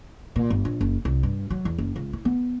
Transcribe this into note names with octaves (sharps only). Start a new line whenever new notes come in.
A#2
G1
A#1
F#1
C2
G2
F#3
E2
F#1
C#2
E4
B3